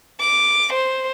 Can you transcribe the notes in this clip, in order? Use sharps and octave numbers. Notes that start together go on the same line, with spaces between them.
D6
C5